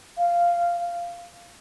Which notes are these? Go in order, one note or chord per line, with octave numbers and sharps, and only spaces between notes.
F5